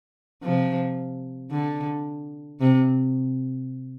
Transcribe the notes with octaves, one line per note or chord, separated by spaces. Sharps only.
C3 F3
D3
C3